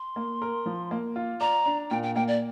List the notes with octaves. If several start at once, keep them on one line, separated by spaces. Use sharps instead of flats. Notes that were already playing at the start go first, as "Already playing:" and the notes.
Already playing: C6
A#3
A#4
F3
A#3
F4
D5 A#5
D4
A#2 G5
G5
A#3 G5
D5